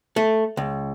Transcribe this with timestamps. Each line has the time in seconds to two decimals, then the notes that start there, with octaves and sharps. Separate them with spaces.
0.16 A3
0.57 C#2